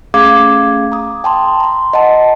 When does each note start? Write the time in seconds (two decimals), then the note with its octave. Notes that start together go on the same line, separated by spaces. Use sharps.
0.14 A3 C#4 G#4 F5 D6 G#6
0.92 A#5 D#6
1.24 G5 A5 C6
1.60 A#5 C6
1.93 D#5 F#5 A5